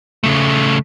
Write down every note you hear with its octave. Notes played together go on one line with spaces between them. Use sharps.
C#3 A3